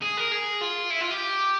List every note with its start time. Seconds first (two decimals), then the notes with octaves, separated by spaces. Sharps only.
0.02 G#4
0.17 A#4
0.32 G#4
0.61 F4
0.90 E4
1.00 F4
1.10 G4